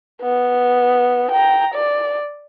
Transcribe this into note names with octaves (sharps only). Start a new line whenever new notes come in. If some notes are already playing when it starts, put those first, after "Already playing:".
B3
G5 A#5
D5